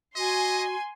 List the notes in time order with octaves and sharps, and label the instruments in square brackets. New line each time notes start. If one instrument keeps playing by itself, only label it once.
[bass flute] F#4 [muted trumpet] D#5 [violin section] G#5 C6